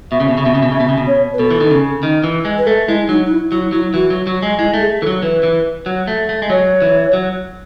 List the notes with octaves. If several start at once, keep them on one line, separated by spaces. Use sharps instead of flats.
B2 E5
C#3
B2
C#3
B2 E5
C#3
B2
C#3
E5
B2
C#3
B2
C#5
B4
B2 A4
E3
D#3
C#3
D#3
E3
G#3
B4
A3 A4
G#3 E4
F#3 D#4
D#4
E4
F#3 E4
F#3 E4
E3 F#4
F#3
F#3
G#3
G#3 E4
A3
G#4
G#4
E3 A4
F#3
E3 B4
E3
F#3
A3
A3
G#3
F#3 C#5
E3
F#3